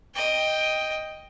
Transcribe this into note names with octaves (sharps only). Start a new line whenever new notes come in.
D#5 G5